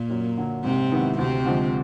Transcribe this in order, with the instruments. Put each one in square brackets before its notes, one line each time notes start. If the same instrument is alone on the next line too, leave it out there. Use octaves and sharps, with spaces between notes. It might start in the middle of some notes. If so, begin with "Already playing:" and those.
Already playing: [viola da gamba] A#2 A#3
[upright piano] F#2
D3 F#3
[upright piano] G#2 [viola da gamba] C3 C4
[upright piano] D#3 G#3 B3 E4
[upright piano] D2 [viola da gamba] C3 C4
[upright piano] D3 F3 G#3